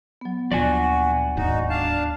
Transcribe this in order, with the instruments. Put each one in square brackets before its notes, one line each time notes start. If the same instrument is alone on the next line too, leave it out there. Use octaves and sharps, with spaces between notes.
[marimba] F#3 B3
[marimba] D2 [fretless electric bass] A#2 F3 [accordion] F#4 [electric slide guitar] D5 F#5 G#5
[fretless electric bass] D1 D#2 G#2 [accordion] D#4 F#4
[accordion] D4 F5 A5